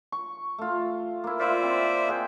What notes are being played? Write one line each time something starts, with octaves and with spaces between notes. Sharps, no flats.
C#6
A3 F4
A#3 E4
E4 F4 C5 D5 E5
C4
G#4 F#5 G5